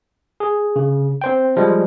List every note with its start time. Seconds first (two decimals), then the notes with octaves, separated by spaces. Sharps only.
0.40 G#4
0.76 C#3
1.22 C4 C5 G5
1.57 F3 G3 G#3